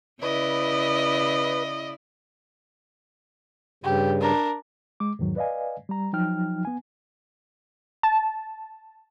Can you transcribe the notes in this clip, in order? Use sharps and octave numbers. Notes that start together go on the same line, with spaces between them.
C#3 E4 B4 D5 D#5
G2 C#3 G4
D4 A#4
G#3 D6
E2 G#2 D#3 F#3
B4 D5 D#5 F5 G#5
G3 A#5
F3 F#3 D#4 G5 F6
B3 G#5
A5